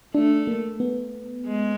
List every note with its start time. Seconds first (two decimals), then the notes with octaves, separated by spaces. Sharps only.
0.14 A3 D4
0.47 A#3
0.80 B3
1.47 G#3